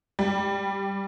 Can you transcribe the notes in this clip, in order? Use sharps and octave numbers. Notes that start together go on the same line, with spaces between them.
G3